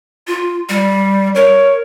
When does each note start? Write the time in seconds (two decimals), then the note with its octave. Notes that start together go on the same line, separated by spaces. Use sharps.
0.27 F4
0.69 G3
1.36 A#4 C#5